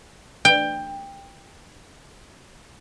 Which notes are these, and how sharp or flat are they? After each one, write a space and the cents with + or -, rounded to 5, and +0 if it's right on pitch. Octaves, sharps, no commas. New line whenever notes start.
G5 +15